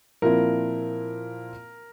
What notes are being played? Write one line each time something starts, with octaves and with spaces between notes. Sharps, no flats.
A#2 F3 C4 E4 A#4